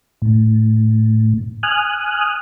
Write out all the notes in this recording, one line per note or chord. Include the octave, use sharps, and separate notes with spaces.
A2
G#5 D#6 F6 F#6